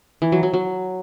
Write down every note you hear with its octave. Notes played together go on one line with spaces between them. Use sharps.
E3
F#3
F#3
F#3